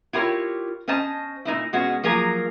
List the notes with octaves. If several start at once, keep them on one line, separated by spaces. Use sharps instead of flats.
E4 F4 G4 A#4 C#5
C#4 C5 D#5 A5
A#2 A#3 D#4 E4
B2 G#3 C#4 F#4
F3 F#3 A#3 G#4 A#4